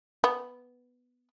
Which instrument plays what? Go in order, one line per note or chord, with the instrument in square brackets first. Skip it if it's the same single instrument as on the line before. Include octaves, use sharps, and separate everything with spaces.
[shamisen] B3